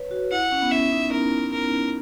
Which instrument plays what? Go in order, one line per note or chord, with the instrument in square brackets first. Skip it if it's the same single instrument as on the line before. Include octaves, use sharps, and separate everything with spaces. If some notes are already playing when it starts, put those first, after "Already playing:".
Already playing: [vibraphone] B4 C#5
F#4
[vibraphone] E4 [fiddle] F#5
[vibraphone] C#4
B3
[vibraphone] C#4 [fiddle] E5
[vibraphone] D#4
[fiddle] A#4
A#4